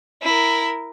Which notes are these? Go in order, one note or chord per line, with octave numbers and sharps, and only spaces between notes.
E4 A#4